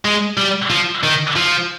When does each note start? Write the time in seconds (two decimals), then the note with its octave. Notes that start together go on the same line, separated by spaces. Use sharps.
0.05 G#3
0.37 G3
0.70 F3
1.03 D#3
1.36 F3